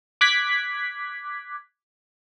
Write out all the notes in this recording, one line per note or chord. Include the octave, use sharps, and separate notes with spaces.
D6 F#6 G#6 B6